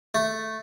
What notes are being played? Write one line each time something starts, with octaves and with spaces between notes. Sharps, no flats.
A3